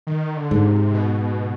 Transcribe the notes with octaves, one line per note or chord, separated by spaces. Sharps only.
D#3
D3
G#2
C3
B2